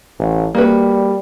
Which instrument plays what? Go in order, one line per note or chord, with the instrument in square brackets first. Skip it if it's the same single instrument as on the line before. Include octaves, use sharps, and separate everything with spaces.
[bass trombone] A1
[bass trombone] G3 [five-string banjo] A#3 F#4 B4